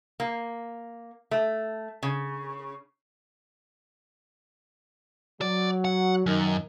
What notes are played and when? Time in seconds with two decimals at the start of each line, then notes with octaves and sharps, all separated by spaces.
0.20 A#3
1.31 A3
2.03 C#3
5.41 F#3 D5
5.85 F#5
6.26 F#2 D#3